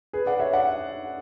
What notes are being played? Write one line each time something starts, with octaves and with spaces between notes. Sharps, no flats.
G#4 B4
D5 F#5
C#5 E5
D5 F#5